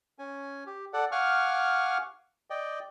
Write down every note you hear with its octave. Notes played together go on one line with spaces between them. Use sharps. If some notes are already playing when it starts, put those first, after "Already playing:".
C#4 G#5
G4
A4 D5 F#5
F5 F#5 G#5 C#6 D6 F6
D5 D#5 G5